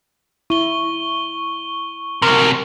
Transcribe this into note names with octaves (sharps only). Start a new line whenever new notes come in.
E4 C#6 G7
C3 F#3 A#4